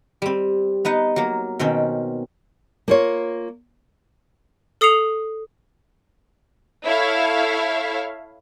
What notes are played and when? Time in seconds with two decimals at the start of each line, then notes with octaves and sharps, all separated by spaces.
0.22 G3 C4
0.85 B3 D#4 B4 F#5
1.16 F#3 A#3
1.59 B2 D#3 C4 C#4
2.88 A#3 F4 C#5
4.81 A4 D#6 C7 C#7 F7
6.85 E4 A4 C#5 E5 F5